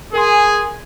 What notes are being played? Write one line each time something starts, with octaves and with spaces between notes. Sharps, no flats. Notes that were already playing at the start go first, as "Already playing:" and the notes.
G#4 A#4 G#5 C6